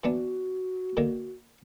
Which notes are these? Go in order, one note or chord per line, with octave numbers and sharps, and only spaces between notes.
E3 B3 D4 F#4
D3 D#3 A#3